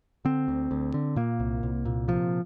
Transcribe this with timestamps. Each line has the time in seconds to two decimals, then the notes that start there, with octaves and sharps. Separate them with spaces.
0.25 D3 C4
0.48 D2
0.71 D2
0.94 D3
1.16 A#2 A#3
1.40 C2
1.63 C2
1.85 A#2
2.08 C3 F3